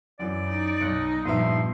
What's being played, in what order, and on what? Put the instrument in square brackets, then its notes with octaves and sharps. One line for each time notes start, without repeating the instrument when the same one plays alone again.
[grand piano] F#2 E3 [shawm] D5
[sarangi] D#4
[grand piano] B1 [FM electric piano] F#6 C#7
[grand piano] G2 F3 E5 [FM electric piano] A#2 B3 [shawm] C6